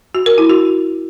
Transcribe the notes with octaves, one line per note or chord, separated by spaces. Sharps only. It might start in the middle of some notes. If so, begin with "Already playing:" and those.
F#4
A#4
E4
F#4